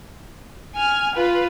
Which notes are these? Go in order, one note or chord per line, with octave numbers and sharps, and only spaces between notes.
G#5 F6
F4 B4